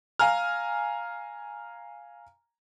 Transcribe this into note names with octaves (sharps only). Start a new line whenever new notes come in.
F5 G#5 A#5 F6